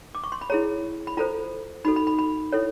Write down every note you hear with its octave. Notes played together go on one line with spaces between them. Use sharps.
D6
C#6
C6
B5
E4 G#4 C#5 A#5
B5
F4 A4 C5 A#5
D#4 F#4 A4 B5
B5
B5
B5
E4 A4 C#5